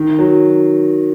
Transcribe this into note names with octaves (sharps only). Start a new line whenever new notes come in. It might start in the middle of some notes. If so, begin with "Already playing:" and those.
Already playing: D#3
F#3